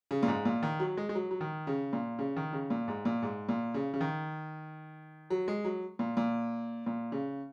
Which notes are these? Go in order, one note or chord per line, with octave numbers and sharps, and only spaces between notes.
C#3
A#2
G#2
A#2
D#3
F#3
G#3
G#3
F#3
F#3
D#3
C#3
A#2
C#3
D#3
C#3
A#2
G#2
A#2
G#2
A#2
C#3
C#3
D#3
F#3
G#3
F#3
A#2
A#2
A#2
C#3